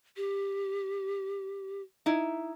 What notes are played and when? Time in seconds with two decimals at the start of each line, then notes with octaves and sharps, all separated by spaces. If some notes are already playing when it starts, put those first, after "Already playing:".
0.16 G4
2.06 D#4 E4